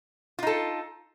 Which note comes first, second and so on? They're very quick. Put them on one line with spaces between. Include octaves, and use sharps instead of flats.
F4 D#4 A4